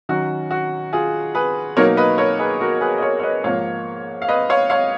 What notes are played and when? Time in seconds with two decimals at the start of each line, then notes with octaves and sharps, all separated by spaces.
0.09 D#3 F#3 C#4 F#4
0.51 F#4
0.93 F4 G#4
1.35 G#4 B4
1.77 B2 F#3 A#3 D#4 A#4 C#5
1.97 B4 D#5
2.18 A#4 C#5
2.39 G#4 B4
2.60 F#4 A#4
2.81 G#4 B4
2.98 D#5
3.02 A#4 C#5
3.19 C#5
3.23 B4 D#5
3.44 G#2 F3 A#3 C#5 F5
4.22 F5
4.28 B4 D#5
4.50 C#5 F5
4.70 C#5 F5